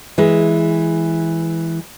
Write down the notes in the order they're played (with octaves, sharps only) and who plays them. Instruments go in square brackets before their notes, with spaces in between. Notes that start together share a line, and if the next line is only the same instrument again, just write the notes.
[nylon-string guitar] E3 G#3